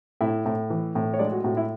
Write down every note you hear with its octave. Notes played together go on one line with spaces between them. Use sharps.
A2 E4 E5
A2
E3
A2
C#5
G#3 D4 D5
F#4
A2 F#4
E4